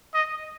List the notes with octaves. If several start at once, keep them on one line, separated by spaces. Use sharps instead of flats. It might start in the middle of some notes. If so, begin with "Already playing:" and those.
D#5